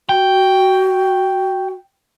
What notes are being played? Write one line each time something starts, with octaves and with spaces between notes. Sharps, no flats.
F#4 G5